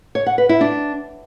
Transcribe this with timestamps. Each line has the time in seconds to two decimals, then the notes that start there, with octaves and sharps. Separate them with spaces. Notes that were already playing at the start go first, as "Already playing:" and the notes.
0.15 C#5
0.27 F#5
0.38 B4
0.49 E4
0.61 D4